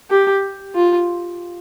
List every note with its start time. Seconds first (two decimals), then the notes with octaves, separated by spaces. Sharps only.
0.11 G4
0.75 F4